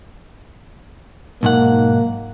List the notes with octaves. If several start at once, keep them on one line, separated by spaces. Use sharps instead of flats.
B1 G#2 A#3 F#5